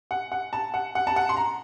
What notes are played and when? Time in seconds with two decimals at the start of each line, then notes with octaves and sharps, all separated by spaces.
0.11 F#5
0.32 F#5
0.53 A5
0.74 F#5
0.95 F#5
1.07 A5
1.16 F#5
1.29 C6
1.37 A#5